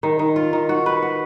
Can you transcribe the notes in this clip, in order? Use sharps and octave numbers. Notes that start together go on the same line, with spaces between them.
D#3
D#3
F4
D#3
F#4
B4
F#4